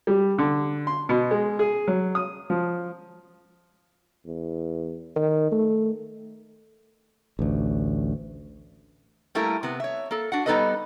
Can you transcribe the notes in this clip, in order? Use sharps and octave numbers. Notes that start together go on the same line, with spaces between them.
G3
D3
C6
B2
G#3
G#4
F#3
D#6
F3
E2
D#3
A3
A1 D2
G3 A3 A#3 E4 A#4
C3 B3
C#5 E5
A#3 A4
D4 F#4 F#5
G3 B3 D#4 A4 B4 D#5